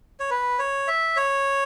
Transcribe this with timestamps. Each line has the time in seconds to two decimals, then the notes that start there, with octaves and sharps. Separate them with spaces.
0.20 C#5
0.30 B4
0.59 C#5
0.88 E5
1.16 C#5